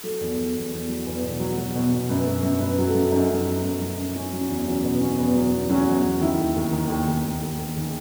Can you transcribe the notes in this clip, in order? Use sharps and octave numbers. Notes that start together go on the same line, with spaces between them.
F#3 A4
E2
E2
E2
E2
F#3
E2 B4
B2
F#3
F#3
B2
B2
F#2 B4
F#2
F#2
F#2 B4
F#3
A4
F#2
F#2 D#4
F#2
F#3
F#2
F#3
F#2
F#3 C#4
F#3
C#4
E2
F#3 C#4
B2 B3
B2 C#4
E2 B3
F#3 B3
E2
F#3 C#4
E2
E2
D#3 E4
D#2
D#2
D#3
D#2
D#2
D#2
D#2
D#2
D#3 G#4